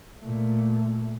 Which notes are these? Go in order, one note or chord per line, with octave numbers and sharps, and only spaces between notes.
A#2 A3